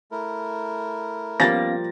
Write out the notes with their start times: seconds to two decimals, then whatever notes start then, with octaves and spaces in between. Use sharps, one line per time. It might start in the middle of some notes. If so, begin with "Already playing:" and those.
0.11 A3 E4 A#4
1.40 F3 G3 A#3 B3 C#4 F5 A6 A#6